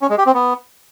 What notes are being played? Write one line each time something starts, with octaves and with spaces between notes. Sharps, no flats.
C#4
G#3
G4
C4
B3